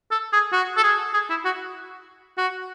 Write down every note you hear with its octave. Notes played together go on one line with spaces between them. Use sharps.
A4
G#4
F#4
A4
G#4
G#4
E4
F#4
F#4